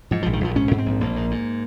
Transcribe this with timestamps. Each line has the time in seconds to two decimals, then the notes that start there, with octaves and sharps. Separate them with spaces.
0.11 G#2 F3
0.22 A#1 F3
0.33 D#3
0.41 A#1 F3
0.56 G#2 C#4
0.71 G#2
0.78 C4
0.86 A#1
1.01 A#1 A#3
1.16 G#2
1.31 G#2